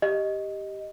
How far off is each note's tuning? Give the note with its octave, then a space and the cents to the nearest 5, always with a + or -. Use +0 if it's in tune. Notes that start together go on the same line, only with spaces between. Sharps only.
G4 +0 D#5 +0